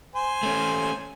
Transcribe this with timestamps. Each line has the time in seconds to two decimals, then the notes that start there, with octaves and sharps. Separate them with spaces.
0.15 C5 G#5
0.43 A3 C#4